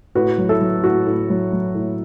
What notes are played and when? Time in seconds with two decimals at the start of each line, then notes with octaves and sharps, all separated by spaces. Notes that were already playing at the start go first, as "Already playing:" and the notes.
0.15 A2 F#4 B4
0.38 F#3
0.49 E4 A4
0.61 F#3
0.84 A2 F#4
1.06 A2
1.30 F#3
1.53 F#3
1.75 A2